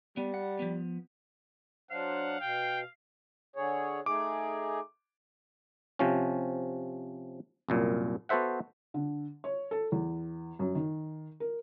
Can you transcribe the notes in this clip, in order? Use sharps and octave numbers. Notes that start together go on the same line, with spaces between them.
G3 B3
F#5
F3 B3
F#3 D4 C5 F5 F#5
B2 G5
D3 G#4 C#5
A3 D#4 G#4 D6
C3 F3 C#4
C2 F#2 A#2
B3 F#4 A4 C5 E5 F#5
D3
C#5
A4
E2
F#2
D#3
A#4